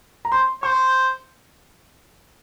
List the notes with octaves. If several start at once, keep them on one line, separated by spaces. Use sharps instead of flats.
A#5
C5 C6
C5 C#6